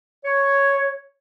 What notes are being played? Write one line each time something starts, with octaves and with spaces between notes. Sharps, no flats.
C#5